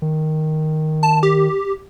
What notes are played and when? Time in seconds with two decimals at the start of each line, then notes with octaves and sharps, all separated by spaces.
0.02 D#3
1.03 A5
1.23 G4